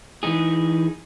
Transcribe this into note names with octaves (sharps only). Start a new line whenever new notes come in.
E3 D#4 G#4